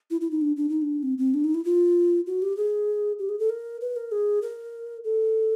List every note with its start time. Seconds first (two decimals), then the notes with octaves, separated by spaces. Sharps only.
0.11 E4
0.21 E4
0.31 D#4
0.41 D4
0.56 D4
0.69 D#4
0.82 D4
1.03 C4
1.18 C4
1.34 D4
1.44 D#4
1.55 E4
1.65 F4
2.27 F#4
2.42 G4
2.57 G#4
3.19 G4
3.29 G#4
3.39 A4
3.50 A#4
3.81 B4
3.96 A#4
4.12 G#4
4.42 A#4
5.04 A4